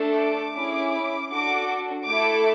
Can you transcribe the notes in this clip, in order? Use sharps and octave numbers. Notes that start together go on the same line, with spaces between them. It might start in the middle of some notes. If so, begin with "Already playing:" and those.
Already playing: A3 D4 A4
D6
C#4 E4 G#4
D4 F#4 A4 D6
A3 E4 A4 D6